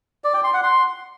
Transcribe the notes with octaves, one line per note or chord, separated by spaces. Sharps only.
D5
G5
C6
F#5
C6